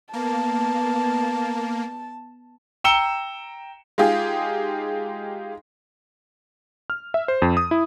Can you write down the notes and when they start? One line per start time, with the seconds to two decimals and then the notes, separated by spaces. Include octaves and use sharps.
0.13 A#3 B3 A5
2.84 G5 A#5 E6 C#7 E7 G7
3.98 G#3 D#4 F4 G4 G#4
6.90 F6
7.14 E5
7.28 C5
7.42 F2
7.57 D#6
7.71 E4